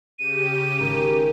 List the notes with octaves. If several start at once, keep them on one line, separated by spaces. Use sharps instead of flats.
C#3 G4 D#7
G#1 D#3